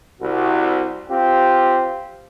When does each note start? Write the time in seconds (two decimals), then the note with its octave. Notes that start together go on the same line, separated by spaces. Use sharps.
0.21 C2 F#4
1.10 C4 F4 G4